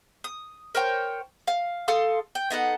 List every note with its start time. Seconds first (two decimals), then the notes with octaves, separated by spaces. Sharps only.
0.24 D#6
0.75 A#4 C5 C#5 G5
1.48 F5
1.88 A4 F5 C6 D#6
2.35 G5
2.50 B3 D#4 A4 F#5